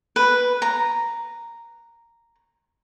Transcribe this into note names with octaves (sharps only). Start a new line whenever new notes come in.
B4
A#5